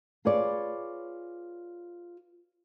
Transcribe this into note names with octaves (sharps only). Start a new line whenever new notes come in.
F4 G#4 B4 C#5 D5